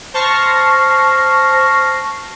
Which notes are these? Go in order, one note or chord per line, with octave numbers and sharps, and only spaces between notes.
C5 A5 C#6 F6 A#6 C7